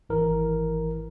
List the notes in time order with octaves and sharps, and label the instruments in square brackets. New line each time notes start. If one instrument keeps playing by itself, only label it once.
[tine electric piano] G#1 E3 A#4